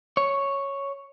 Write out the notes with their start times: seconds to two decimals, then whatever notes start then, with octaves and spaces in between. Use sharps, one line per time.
0.17 C#5